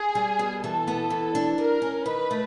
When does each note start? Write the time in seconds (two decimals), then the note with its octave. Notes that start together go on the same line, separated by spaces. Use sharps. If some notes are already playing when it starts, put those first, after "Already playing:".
Already playing: G#4
0.15 G3
0.39 B2
0.63 E3 A4
0.88 B3
1.10 E3
1.35 D4
1.58 G3 A#4
1.82 C#4
2.06 D#3 B4
2.31 A3